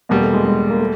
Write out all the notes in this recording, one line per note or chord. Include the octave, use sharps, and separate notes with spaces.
E2 B2 G3 A#3
A3
G#3
G#3
A#3
A3